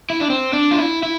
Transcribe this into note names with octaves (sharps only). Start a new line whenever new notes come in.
E4
D4
C4
D4
F4
E4
E4